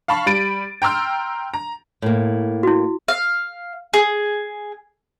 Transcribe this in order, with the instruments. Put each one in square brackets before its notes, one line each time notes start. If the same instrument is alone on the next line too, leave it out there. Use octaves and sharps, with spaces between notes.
[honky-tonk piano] F5 A5 B5 C#6
G3 B5 A6 D7 D#7
G5 A#5 C6 E6 F6
A#5
[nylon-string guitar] A2 A#3
[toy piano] E4 F#4
[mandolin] F5
G#4